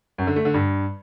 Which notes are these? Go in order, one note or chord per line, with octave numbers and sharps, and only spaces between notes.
F#2
D3
A3
D3
G2